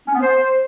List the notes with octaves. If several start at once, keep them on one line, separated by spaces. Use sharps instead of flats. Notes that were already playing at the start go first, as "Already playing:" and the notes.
C#4
B3
C5